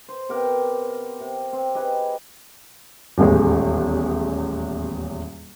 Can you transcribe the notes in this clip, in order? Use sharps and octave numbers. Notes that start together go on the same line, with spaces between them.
C5
C3 B3 G4 A#4
C3
C4
D#4 G4 G#4 B4
D#1 A1 E2 G#3